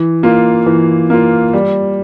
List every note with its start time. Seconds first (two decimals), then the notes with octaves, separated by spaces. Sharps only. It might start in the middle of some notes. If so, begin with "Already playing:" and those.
Already playing: E3
0.23 A#3 F4
0.66 E3
1.10 A#3 F4
1.53 G3